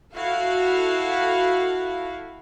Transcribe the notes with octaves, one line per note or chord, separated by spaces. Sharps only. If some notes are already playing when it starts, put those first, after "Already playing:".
E4 F#4 A4 F5